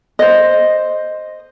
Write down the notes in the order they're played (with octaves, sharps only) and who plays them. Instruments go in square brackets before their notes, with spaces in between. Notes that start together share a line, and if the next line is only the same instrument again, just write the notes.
[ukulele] C5 D#5